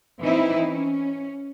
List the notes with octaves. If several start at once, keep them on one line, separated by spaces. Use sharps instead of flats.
E3 C4 D#4 E4
C#4